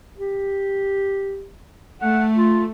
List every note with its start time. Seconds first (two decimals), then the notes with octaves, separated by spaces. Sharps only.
0.18 G4
2.02 A3 F#5
2.35 F4